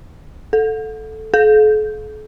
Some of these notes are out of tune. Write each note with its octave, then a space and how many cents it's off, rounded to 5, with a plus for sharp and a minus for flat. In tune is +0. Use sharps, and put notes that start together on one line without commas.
A4 -5
A4 -45